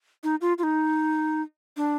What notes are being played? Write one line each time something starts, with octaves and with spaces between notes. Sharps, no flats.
D#4
F4
F4
D#4
D4